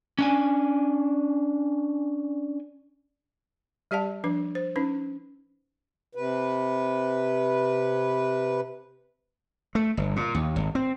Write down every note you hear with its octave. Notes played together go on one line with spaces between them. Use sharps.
C#4 D4 G#5
G3 G4 D5 F5 A5
F3 D4 B4
C5
C#4 D#4 B4
C3 B4
A3
G1
A#2
D#2
G#1
C4